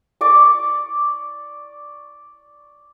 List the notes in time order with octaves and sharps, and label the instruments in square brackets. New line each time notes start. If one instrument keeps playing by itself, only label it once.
[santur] D5 C#6 D6